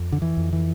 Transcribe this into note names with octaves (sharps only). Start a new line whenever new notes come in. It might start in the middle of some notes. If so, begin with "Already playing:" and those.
Already playing: F2
D3
E3
F2
E3